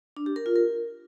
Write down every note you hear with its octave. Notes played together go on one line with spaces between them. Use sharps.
D4
G4
A#4
F4
A#4